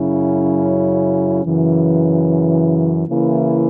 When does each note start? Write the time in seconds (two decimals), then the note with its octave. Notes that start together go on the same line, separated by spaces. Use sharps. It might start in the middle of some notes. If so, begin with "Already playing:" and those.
Already playing: F#2 C#3 F#3 C#4 E4
1.44 F#2 C#3 E3
3.07 C#3 E3 A#3 E4